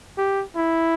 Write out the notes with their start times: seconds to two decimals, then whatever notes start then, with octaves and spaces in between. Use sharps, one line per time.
0.18 G4
0.56 E4